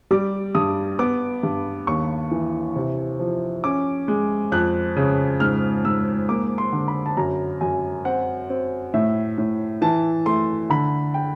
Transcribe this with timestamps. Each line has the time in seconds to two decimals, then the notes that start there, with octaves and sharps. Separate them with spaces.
0.11 G3 D6
0.55 G2 D#6
0.99 B3 D6
1.43 G2
1.87 D#2 C#6
2.31 E3
2.76 C3
3.19 F3
3.64 C#4 D6
4.08 G#3
4.52 F2 F#6
4.96 C#3
5.40 G#2 F6
5.85 G#2 E6
6.28 A#3 D6
6.58 C6
6.73 D3
6.88 B5
7.06 A5
7.17 F#2 A#5
7.61 F#2 G#5
8.05 C4 F#5
8.50 C4
8.94 A2 E5
9.38 A2
9.82 E3 A5
10.26 A3 C6
10.70 D3 B5
11.14 G5